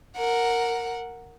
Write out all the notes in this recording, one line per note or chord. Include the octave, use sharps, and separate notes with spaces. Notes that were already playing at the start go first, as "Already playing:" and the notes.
A#4 F#5